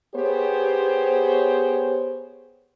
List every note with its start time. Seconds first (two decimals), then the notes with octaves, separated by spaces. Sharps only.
0.15 B3 G4 G#4 C5 C#5